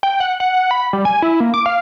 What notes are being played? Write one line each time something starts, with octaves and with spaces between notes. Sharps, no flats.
G5
F#5
F#5
B5
G3
G#5
E4
A#3
D6
F5